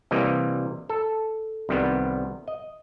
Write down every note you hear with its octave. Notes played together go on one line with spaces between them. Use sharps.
C3 E3 G3 A#3 D#5
A4
C2 C3 D#3 G3 B3
D#5